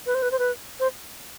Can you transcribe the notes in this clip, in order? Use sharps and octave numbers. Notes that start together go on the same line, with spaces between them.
B4
C5
B4
C5
B4
C5